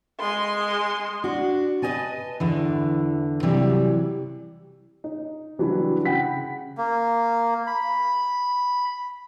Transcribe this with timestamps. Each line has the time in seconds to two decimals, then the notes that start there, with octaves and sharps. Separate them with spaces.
0.20 G#3 C6
1.24 D4 F#4
1.82 B4 C#5 D#5 G#5 A5
2.40 E2 D3 E3
3.43 C3 E3 F#3 G3
5.04 D#4
5.58 C#3 E3 F#3 G3 D4 E4
6.05 C#3 F#5 G5 B5 B6
6.78 A#3
7.67 B5